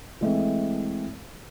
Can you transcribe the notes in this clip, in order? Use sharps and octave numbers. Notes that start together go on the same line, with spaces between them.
E3 G#3 A3 C4